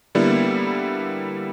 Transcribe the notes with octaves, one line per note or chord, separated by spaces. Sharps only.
D3 G3 A#3 B3 E4